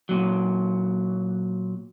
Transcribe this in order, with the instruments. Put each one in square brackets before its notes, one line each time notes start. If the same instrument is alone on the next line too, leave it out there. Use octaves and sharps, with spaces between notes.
[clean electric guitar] A#2 F#3